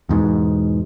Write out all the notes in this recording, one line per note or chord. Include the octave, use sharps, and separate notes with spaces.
E2 G#2 B2